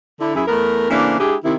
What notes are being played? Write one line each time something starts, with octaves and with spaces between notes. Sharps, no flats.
D3 E4
F#2 E4 G#4
E2 A3 B3 A#4
C#3 E3 A3 A#3 C4 D4
G#3 D4 E4 G4 G#4
C3 D#3 E4